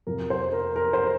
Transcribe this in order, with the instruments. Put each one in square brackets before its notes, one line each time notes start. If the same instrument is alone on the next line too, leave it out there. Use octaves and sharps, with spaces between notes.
[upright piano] F2 C3 F3 A#4
C5
A#4
A#4
C5